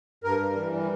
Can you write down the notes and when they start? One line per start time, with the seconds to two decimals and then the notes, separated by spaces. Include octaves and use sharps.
0.24 G2 A#4
0.40 G3
0.56 E3
0.74 G3